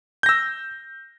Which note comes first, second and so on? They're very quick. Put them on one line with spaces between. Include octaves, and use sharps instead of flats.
G6 A#6 E6